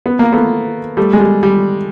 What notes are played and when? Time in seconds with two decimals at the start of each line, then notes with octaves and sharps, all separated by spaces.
0.06 B3
0.19 A#3
0.33 A3 B3
0.97 G3 A3
1.13 G#3
1.20 G3
1.43 G3